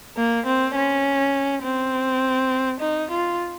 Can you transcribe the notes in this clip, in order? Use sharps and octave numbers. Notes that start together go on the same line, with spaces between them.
A#3
C4
C#4
C4
D#4
F4